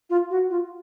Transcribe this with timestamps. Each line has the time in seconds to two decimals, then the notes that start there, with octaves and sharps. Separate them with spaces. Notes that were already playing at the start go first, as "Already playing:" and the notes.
0.10 F4
0.30 F#4
0.50 F4